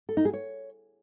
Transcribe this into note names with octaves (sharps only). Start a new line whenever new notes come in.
A4
D#4
G#4
C#5